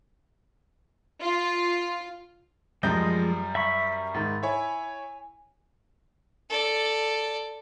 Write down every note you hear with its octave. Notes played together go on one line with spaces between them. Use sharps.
F4
F#2 F3 G3 G#3 D#5 G6
E5 B5 C#6 B6
G#2 D#3 A6
E4 C#5 G#5
A4 D5